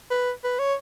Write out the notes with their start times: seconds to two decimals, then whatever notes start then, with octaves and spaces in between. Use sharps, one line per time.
0.11 B4
0.44 B4
0.59 C#5